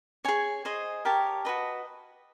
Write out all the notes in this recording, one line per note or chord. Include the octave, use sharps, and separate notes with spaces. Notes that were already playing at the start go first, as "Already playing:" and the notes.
G#4 C#5 G#5
G#4 C5 D#5
G4 A#4 C#5 A5
F#4 B4 D#5